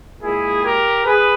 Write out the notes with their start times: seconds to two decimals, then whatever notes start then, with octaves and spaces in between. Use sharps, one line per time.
0.21 A#2 G#3 E4 G#4
0.63 G4 A#4
1.05 G#4 B4